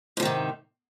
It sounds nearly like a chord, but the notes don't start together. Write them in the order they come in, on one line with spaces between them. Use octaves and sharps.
G#2 F3 D#3 C3